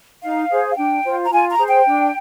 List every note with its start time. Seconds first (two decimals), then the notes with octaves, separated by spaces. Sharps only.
0.22 D#4 F5
0.50 G#4 C5
0.71 F5
0.77 D4 G5
1.04 F4 C5
1.24 A#5
1.31 F4 G#5
1.50 A#5
1.58 G#4 C5
1.68 G5
1.86 D4